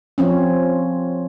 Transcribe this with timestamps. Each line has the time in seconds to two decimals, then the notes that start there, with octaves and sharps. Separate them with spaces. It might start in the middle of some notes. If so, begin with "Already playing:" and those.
0.18 F3 C4 C#4